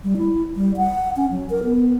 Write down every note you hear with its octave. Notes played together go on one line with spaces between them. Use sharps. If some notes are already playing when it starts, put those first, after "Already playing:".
G3
E4
G3
F#5
C#4
F#3
A#4
B3